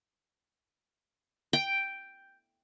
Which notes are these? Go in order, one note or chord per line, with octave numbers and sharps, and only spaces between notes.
G5